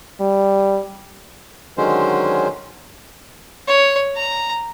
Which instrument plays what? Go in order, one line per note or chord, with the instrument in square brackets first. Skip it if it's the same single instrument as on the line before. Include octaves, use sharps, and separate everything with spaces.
[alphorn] G3
[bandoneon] D3 D#3 F#3 G#3 C#4 C5
[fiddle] C#5
A#5